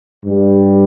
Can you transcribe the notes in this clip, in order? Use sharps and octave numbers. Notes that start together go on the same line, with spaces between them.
G2 G3